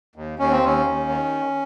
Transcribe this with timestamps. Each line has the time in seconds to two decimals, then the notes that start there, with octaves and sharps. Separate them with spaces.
0.16 D#2
0.39 D#2 C#4
0.52 C4
0.62 D#2 C#4
0.86 D#2
1.09 D#3